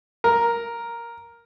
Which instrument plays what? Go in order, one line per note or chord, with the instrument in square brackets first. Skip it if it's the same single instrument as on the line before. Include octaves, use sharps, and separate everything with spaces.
[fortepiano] A#4